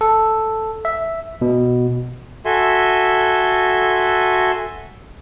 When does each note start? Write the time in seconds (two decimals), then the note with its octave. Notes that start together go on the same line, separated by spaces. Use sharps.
0.01 A4
0.85 E5
1.42 B2
2.45 F#4 A4 E5 G#5 C6